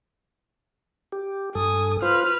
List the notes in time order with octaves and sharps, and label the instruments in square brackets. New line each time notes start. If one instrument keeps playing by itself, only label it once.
[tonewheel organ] G4
[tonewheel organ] G2 A4 [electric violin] G#5 D#6
[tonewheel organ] F4 C5 [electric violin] B4 F6